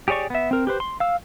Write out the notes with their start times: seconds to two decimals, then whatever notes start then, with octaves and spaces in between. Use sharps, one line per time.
0.08 G4 G#4 C#5 D5 C#6
0.30 B3 E5
0.51 C4 A#4
0.67 G4 B4 C5
0.80 C6
1.00 F5 E6